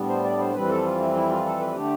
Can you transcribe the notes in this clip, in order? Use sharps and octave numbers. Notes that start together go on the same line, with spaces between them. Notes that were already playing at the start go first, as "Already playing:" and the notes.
Already playing: A2 G3 B3 D4
C5
D5
C5
F2 E3 G3 C4 B4
A4
F4
E4
E4
F4
A4
B4
D3 A3 D4 G4